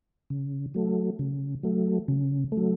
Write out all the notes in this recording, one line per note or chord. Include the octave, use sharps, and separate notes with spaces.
C#3
F#3 A3
C#3
F#3 A3
C#3
A3
F#3